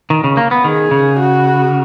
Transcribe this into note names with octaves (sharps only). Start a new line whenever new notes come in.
D#3
C#3
A#3
B3
D#3 G#4
C#3
F#4